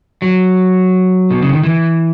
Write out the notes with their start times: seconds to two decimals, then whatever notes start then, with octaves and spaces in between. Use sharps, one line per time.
0.22 F#3
1.31 B2
1.42 C#3
1.53 D#3
1.63 E3